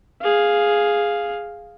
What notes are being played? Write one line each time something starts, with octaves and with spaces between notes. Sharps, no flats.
G#4 F5